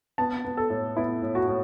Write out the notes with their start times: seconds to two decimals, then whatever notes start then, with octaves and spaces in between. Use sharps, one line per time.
0.18 B3 A5
0.45 B3
0.57 A4
0.70 A2
0.96 B3 E4
1.22 A2
1.35 F#4
1.48 A2